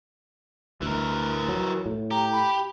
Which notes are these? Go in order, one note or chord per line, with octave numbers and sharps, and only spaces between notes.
D2 E3 A#4
F#3
A2
G4 A#5
B5